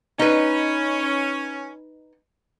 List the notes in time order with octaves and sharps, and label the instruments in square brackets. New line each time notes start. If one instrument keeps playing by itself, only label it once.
[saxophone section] C#4 [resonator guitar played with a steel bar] D#4 B4